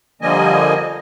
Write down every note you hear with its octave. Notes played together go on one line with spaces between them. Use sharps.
D3 F3 G3 A#3 D#5 G#5